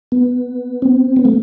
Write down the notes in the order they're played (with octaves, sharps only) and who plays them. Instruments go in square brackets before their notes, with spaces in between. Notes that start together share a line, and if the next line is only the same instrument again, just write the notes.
[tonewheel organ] B3
C4
B3
A3